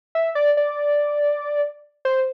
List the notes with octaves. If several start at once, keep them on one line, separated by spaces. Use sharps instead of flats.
E5
D5
D5
C5